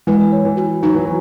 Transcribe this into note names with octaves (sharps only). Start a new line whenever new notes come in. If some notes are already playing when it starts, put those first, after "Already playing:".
E3 G#3
C#5
E3
F#4
F#3 D#4
E3
F#3